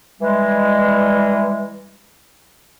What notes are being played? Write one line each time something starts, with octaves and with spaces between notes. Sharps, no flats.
E3 G3 G#3